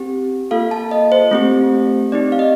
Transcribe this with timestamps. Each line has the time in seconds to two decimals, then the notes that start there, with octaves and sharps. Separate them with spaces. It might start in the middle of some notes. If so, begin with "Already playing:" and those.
Already playing: C4 G4
0.51 A#3 F4 A4 F5
0.71 A5
0.91 D#5
1.12 C5
1.31 A3 C4 G4
2.12 C4 D#4 G4 D5
2.32 F5
2.39 D#5